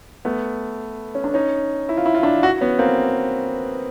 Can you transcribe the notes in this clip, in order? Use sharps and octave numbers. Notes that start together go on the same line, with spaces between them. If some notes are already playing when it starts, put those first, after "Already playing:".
A3 B3
C#4
D4
C#4 D#4
E4
F4
E4
F4
D4 E4
E4 F#4
B3 C#4
A#3 C4